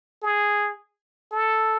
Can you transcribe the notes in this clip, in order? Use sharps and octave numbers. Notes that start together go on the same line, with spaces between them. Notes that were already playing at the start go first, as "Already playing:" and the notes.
G#4
A4